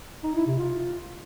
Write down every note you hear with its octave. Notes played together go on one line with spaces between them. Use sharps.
D#4
E4
C3
F4